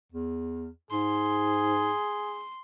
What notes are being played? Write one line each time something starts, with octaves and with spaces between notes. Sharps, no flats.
E2
G#2 G#4 C6